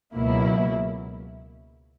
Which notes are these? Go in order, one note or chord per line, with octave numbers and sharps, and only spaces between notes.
C#2 B2 F#3 A#3 E4